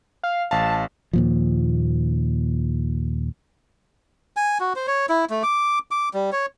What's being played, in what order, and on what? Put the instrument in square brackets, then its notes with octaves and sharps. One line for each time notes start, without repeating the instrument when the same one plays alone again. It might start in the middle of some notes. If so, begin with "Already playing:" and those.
[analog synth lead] F5
[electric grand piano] A1 F5 [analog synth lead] A5
[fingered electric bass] D#2 A#2 F3
[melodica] G#5
F#4
C5
C#5
E4
A3
D6
D6
G3
C#5